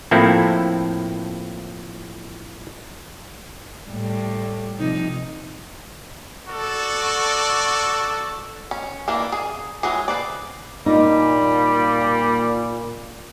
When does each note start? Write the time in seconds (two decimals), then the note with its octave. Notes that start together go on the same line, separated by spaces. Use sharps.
0.11 A2 F3 A#3 C4 E4 A4
3.88 A2 G3
4.79 C3 F3 D#4
6.48 F#4 A4 D5
8.71 C#4
9.08 E3 A#3 D4
9.32 G#4
9.83 E3 F#3 G#3 G#4
10.08 G#4 B4 C5 D5
10.86 A#2 G3 D#4